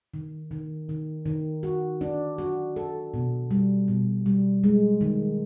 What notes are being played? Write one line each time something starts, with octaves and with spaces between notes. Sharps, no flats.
D#3
D#3
D#3
D#3
F#4
D4
F#4
A4
B2
G3
B2
G3
G#3
D#3